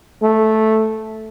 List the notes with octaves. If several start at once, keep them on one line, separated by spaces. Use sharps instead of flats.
A3